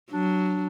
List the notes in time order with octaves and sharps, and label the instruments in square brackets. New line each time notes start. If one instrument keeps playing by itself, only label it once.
[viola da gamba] F#3 [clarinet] D4